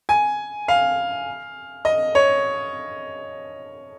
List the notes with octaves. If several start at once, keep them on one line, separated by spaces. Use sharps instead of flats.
G#5
F5
D#5
C#5